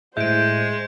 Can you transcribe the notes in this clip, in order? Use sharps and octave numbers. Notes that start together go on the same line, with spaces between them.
A2 G#3 C5 E5 G6 D7